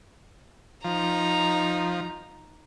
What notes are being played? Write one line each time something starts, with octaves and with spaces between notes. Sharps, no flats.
F3 D#4 A#5